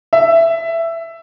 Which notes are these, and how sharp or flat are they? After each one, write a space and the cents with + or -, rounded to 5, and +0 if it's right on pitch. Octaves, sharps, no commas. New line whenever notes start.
E5 +10